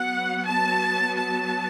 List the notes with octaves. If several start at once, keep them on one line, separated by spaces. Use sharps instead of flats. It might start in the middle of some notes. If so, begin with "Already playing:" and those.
Already playing: F#3 B3 F#5
A5
A5